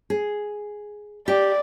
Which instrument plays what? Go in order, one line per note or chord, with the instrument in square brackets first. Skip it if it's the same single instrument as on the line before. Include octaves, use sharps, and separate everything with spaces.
[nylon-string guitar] G#4
[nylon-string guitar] G4 [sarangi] D5